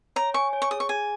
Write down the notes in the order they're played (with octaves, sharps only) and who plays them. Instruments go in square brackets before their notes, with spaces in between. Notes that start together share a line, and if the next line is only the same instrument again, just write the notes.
[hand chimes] C#5 [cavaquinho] A#5
[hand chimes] G#5 [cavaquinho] C#6
[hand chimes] C#5
[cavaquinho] C#6
[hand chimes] G#4 [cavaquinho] D#6
[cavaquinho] C#6
[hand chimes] G#4 [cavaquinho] G#5